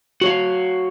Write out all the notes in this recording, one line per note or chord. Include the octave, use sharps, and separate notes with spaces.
F#4 C#5 F5